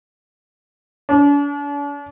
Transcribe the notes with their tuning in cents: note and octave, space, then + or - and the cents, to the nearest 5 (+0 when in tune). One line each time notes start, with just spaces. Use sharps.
D4 -45